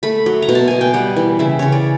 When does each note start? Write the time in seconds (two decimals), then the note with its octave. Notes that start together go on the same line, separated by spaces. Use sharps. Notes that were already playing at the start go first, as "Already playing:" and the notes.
0.03 A3 B5
0.26 F#3
0.42 A#5
0.49 B2
0.55 A5
0.68 B2 G#5
0.81 G5
0.94 G3 F#5
1.16 E3
1.39 C#3 E5
1.59 C#3 C#5
1.72 D5